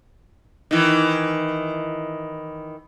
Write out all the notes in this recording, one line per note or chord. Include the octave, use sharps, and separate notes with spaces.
D#3 E3